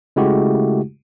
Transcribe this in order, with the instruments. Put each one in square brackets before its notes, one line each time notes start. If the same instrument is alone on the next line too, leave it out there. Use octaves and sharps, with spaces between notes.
[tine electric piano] C#3 G#3 A3 E4 F#4 G4